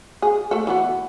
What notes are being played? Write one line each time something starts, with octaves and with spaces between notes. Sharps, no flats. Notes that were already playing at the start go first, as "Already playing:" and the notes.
G#4
A3 A4
E3 B3 F#4